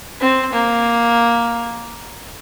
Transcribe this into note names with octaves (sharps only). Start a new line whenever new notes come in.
C4
A#3